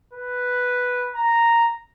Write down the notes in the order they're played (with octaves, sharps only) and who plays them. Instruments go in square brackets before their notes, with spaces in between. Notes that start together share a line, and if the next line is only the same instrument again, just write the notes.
[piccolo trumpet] B4
A#5